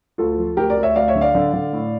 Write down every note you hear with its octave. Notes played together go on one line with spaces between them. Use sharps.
D2 F4 A4
F3
D2 G4 A#4
A#4 D5
D2
C#5 E5
D2 D5 F5
C#5 E5
D3
D5 F5
D3
D3
A2